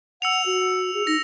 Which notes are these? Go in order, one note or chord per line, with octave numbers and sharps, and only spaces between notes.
F#5 E6 C#7 F7
F#4
G#4
D#4 A#6